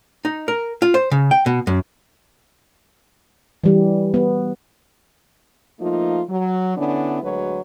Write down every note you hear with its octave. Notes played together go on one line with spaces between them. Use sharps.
D#4
A#4
F4
C5
C#3
G5
B2
F#2
E3 G3
B3
F3 A3 A#3 D#4 F4
F#3
D3 B3 C#4 D4 E4
D2 F#3 G#3 B4 C#5